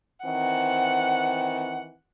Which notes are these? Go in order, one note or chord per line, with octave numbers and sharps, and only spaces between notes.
D#3 E3 C4 F#5